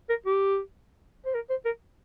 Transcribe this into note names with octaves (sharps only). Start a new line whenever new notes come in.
A#4
G4
C5
A#4
C5
A#4